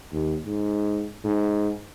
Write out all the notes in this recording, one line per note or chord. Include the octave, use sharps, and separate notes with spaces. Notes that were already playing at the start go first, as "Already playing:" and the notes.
D#2
G#2
G#2